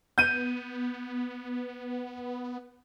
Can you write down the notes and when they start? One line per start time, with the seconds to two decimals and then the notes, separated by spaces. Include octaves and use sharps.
0.18 B3 G6 D#7